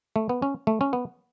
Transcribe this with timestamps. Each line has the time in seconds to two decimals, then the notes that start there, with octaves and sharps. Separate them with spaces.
0.16 A3
0.29 B3
0.42 C#4
0.67 A3
0.81 C#4
0.93 B3